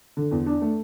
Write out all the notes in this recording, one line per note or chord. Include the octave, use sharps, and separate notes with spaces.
D3
E2
D4
A3